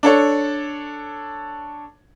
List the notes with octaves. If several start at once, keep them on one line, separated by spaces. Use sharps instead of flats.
D4 A4 C#5